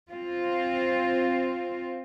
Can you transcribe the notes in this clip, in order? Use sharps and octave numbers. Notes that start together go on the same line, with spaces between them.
C4 F4